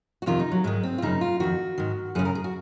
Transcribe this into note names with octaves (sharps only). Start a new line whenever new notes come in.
F#4
F2 C3 D#3 F4
D#4
F#3
G#2 D#3 G#3
C4
F4
F#2 C#3 D#4
F4
F2 D#3 F#4
G#2 D#3
F#2 C#3 G#4
A#4
G#4
F#4